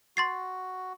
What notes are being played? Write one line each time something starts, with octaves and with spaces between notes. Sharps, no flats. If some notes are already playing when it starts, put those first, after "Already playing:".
F#4 C6 A6 C7